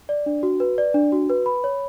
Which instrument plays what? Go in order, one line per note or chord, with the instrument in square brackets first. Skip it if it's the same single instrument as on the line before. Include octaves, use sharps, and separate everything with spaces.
[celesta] D5
D4
F#4
B4
D5
D4
F#4
B4
B5
C#5